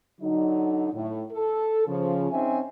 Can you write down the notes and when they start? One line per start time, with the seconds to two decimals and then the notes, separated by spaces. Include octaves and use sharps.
0.21 D3 F#3 D#4
0.93 A2
1.32 A4
1.87 C#3 F3
2.31 C4 C#4 D#4 E5 G#5